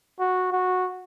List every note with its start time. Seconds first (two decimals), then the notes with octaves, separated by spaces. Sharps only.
0.20 F#4
0.52 F#4